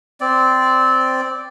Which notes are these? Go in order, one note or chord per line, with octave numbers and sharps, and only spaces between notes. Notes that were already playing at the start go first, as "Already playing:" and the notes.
C4 D5